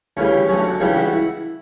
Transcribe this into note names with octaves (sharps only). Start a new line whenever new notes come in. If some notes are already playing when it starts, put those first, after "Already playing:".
D2 C#3 E3 G3 C#4
D2 D3 F#3 C#4
D4
D4
C#2 C#3 E3 G3 D4
F#4
E4